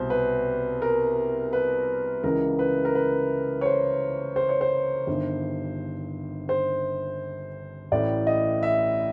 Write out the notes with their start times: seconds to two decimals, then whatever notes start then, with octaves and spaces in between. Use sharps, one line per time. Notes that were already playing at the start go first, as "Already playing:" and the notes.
Already playing: C2 B2 C5
0.10 B4
0.82 A#4
1.53 B4
2.24 C#2 C#3 E3 A#4
2.59 B4
2.85 A#4
2.95 B4
3.61 C#5
3.66 C5
4.36 C5
4.49 C#5
4.61 C5
5.07 G1 G2 D#3
6.49 C5
7.92 A1 A2 E3 D5
8.27 D#5
8.63 E5